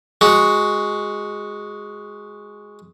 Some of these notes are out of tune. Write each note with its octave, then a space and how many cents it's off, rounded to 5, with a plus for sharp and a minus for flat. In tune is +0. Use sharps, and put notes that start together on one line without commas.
G#3 +0 F#4 +0